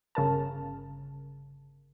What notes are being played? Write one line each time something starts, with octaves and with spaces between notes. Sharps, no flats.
G1 C#3 A#4 A5